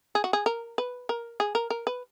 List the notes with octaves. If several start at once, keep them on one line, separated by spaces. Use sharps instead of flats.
G#4
F#4
G#4
A#4
B4
A#4
G#4
A#4
A#4
B4